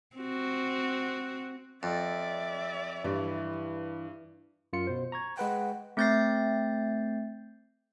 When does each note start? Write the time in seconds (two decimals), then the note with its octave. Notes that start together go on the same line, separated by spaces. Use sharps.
0.17 C4 F#4
1.83 F2 D5 E5
3.04 G2 E3
4.73 F#2 F4 C#7
4.87 B2 C5
5.12 A#5 C#6 G#6
5.37 G#3 B4 F#5 G5
5.97 A3 C4 G6 A6 A#6 C7